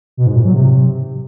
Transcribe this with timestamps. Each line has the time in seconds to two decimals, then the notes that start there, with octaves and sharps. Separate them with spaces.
0.17 B2
0.27 G#2
0.36 A#2
0.45 F#3
0.54 C3